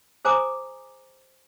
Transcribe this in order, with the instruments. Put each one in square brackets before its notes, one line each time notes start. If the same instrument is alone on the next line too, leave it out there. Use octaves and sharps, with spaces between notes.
[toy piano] G#4 C5 G#5 A#5 D6 D#6